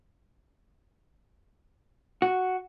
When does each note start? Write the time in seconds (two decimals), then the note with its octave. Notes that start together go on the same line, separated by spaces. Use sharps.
2.22 F#4